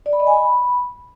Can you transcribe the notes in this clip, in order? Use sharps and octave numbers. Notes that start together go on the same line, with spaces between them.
D5
B5
D#5
G#5
B5